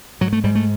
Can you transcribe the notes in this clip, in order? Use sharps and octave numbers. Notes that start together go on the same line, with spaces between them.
G#2 F#3
A3
G#2 G3
A3